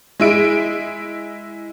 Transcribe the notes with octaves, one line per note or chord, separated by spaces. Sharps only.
G#3 E4 D7